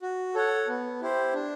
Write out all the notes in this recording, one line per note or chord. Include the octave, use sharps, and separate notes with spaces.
F#4
A4 C#5 F#5
B3
E4 G4 C5
D4